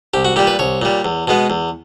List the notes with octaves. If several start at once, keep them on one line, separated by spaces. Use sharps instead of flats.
C2 G4
F#4
A#2 G3 G4
B4
C2 C#5
A#2 G3
E2
B2 G#3 B3
E2